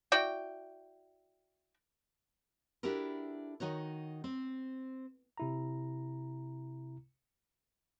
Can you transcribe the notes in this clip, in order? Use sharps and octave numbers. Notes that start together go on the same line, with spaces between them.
E4 F#4 D5 G5
D4 E4 F#4 G4 A4 A#4
D#3 D#4 F#4 C#5
C4
C3 E4 A#5